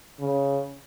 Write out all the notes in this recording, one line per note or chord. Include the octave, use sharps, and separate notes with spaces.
C#3